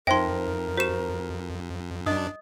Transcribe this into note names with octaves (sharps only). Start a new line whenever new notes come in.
F2 D#4 A#4 C5 E5 G5 C6
F#4 G4 C5 E7
F#2 D4 D#5 D#6